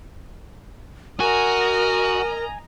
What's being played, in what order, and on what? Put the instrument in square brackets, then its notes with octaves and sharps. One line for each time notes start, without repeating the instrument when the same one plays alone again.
[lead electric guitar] F#4 [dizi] A#4 [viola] D#5 A#5 [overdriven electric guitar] G#5